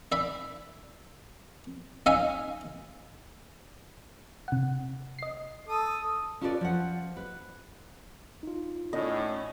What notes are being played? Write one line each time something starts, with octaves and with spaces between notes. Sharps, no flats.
D5 E5 B5
C#4 D#4 E5 F5 G#5
C3 F#5
D#5 C7
A4 D#6
C#4 F4 A4 B4 C5 D5
F3 F#5
B4
D#4 F4
A2 C#4 D#5